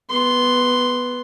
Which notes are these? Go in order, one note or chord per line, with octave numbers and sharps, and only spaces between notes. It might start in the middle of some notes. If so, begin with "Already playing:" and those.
B3 C6